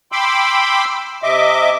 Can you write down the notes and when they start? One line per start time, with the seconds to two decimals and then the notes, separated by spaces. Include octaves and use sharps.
0.12 G5 B5 C6 D6 E6
1.23 C3 D#5 E5 D6